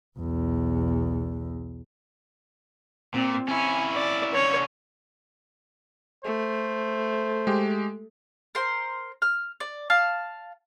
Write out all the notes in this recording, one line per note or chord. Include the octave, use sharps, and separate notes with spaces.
B1 E2
A#2 C4
C#4 E4 G#5
D5
D3 C#4 C#5
A3 C5
G#3 G4
A#4 C5 C6
F6
D5
F5 A5